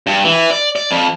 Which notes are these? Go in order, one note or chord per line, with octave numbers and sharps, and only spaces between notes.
G2
E3
D5
D5
F2